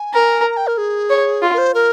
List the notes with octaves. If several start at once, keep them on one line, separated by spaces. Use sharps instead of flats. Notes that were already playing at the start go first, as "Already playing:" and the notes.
Already playing: G#5
A#4
A#5
G5
A#4
G#4
C#5
F4
A#4
C5
A#4